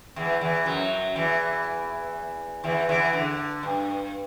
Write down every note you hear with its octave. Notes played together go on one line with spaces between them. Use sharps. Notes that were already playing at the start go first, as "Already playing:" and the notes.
E2 E3
E2 E3
F#2 F#3
E2 E3
E2 E3
E2 E3
D3
G2